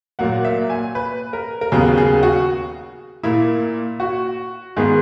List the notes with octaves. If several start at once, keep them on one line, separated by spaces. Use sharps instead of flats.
A#2 F#3 A#3 F#5
E5
G#5
B4
A#4
A#4
D#2 C#3 F#3 B3 G#4
G#4
F#4
A#2 A#3 E4
F#4
G#2 D#3 G#3 B3 G#4